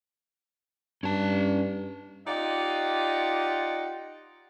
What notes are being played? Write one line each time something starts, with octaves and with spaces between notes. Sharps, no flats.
G2 C#4 A5
D#4 F4 G4 D5 D#5 F#5